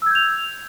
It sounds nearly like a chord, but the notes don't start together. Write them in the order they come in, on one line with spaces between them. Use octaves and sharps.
E6 G#6 G6 F7